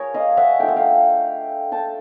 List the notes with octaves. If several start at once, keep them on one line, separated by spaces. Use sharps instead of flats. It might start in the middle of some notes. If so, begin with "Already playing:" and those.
Already playing: F3 A#3 G#4 A#4 C#5
D#5 F5
E5 F#5
A3 D4 F4 G5
F#5
F5 G5
G5 A5